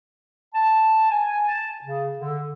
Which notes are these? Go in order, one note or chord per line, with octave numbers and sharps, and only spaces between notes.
A5
G#5
A5
C#3
D3